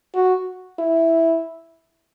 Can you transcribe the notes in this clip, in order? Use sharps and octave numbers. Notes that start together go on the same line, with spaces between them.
F#4
E4